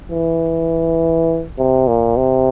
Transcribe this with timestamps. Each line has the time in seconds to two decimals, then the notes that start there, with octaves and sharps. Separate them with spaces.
0.12 E3
1.58 C3
1.88 A#2
2.17 C3